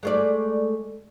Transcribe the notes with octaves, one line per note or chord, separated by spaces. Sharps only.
G#3 A3 D5